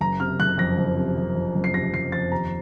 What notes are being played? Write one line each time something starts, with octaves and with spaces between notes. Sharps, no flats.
F#1 A#5
C3 F6
F#1 F#6
F2 A#6
F#1
C3
F#1
F2
F#1
C7
C3 A#6
F#1 C7
F2 A6
D#2 A#5